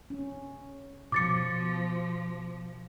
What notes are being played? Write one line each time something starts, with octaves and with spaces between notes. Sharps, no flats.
C#4
B2 F3 D6 A6 C#7